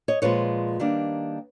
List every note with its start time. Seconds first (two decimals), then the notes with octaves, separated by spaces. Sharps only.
0.08 C#5 D#5
0.22 A#2 F3 G#3 B4 C#5
0.80 D#3 G3 A#3 D4